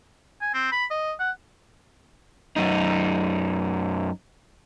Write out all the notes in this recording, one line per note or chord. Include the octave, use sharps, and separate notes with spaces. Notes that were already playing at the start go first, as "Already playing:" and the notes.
G#5
C4
B5
D#5
F#5
F#2 D#4